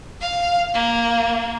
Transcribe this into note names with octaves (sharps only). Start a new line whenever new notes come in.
F5
A#3